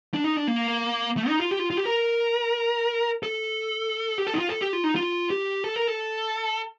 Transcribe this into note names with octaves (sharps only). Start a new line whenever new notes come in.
D4
D#4
D4
A#3
A3
D#4
F4
G4
F4
F4
G4
A#4
A4
G4
A4
D#4
F4
A4
G4
F4
D#4
F4
G4
A4
A#4
A4